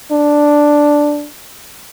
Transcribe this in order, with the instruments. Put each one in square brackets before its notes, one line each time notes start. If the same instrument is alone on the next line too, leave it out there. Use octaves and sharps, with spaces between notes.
[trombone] D4